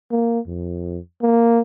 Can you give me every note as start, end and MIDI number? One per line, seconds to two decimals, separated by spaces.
0.12 0.39 58
0.47 0.98 41
1.22 1.60 58